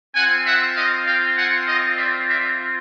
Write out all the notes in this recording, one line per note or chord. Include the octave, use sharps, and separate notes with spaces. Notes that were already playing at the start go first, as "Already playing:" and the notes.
C4 F4 F#5 G#5
E5 F#5
D#5 F5
F5 G5
F#5 G#5
D#5 F5
D5 E5
D5 E5